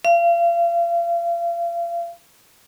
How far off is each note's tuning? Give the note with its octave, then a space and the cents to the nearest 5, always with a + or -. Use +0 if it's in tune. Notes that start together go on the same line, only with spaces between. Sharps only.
F5 -35